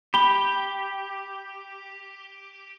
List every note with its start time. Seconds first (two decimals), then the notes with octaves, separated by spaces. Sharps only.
0.14 G4 B5 G7